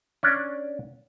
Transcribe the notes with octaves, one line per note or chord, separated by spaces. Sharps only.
C#4 D4 D5